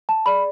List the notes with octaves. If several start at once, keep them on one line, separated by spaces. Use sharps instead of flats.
A5
G#4 D5 B5